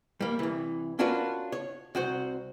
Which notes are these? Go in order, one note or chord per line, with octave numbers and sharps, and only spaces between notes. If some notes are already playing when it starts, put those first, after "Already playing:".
G3 A#3
C2 E3
C#4 D4 F4 F#4 A#4 B4
C#5
C2 F#4 C5